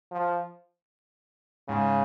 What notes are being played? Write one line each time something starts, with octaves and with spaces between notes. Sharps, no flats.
F3
G#2 C#3